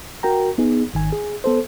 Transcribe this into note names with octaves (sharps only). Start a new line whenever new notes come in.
F#4 A#4 G5 A#5
B3 D#4 G#4
G#1 D#3 G#5
G#4
B3 A4 C5